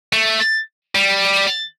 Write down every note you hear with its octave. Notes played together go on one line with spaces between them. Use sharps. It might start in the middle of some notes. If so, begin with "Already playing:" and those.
A3
G3